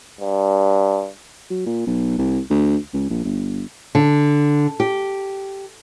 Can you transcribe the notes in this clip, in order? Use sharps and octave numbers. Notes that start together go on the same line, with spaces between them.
G2
F#3
A#2
B1
C2
D2
C#2
A#1
G1
D3
G4